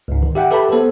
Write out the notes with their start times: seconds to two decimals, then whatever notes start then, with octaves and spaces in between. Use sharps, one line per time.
0.08 C#2 G#2
0.23 D#3
0.35 G4 E5 F#5 G5
0.51 G4 A4 B4 E5 A5 B5
0.72 B3 A4 C5